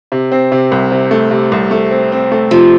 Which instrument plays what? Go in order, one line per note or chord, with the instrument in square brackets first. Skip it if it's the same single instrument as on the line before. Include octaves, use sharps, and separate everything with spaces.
[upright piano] C3
C4
C3
C2
C3
A3
C3
C2
A3
C4
C4
A3
[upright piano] C3 [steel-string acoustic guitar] F3